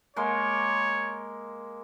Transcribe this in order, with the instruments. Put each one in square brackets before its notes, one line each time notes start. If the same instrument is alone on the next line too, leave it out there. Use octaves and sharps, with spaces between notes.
[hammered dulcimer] G#3 A#3 C6 [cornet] C#5